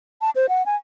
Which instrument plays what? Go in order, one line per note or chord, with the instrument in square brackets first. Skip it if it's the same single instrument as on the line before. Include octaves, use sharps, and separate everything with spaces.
[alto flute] A5
C5
F#5
G#5